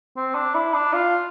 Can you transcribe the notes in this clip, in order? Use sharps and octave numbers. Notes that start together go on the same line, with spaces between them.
C4
D4
E4
D4
F4